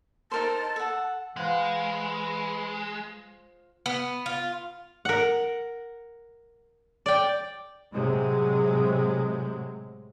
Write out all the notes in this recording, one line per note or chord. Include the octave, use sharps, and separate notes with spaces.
D#4 A#4 C5 A5
A4 F#5
E3 G#3 F4 C5 F#5
B3
F4
A#4 F#5
D5 G5
A2 C3 F#3 G#3